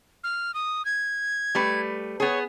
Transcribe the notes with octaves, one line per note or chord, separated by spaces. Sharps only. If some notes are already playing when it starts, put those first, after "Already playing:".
F6
D#6
G#6
G3 A3 B4
B3 G#4 C#5